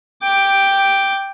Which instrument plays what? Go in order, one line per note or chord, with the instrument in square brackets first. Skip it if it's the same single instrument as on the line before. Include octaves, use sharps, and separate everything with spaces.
[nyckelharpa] G5 D6